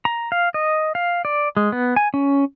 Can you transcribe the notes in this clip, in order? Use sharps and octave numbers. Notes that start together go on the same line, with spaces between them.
A#5
F5
D#5
F5
D5
G#3
B3
G#5
C#4